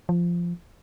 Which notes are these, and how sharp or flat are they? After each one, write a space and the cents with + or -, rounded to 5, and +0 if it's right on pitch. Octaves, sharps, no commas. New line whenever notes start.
F3 -10